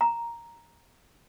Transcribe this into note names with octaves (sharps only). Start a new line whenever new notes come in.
A#5